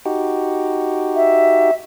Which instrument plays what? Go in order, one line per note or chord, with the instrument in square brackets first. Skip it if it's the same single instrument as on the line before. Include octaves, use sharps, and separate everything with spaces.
[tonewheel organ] D#4 F#4 G4
[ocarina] E5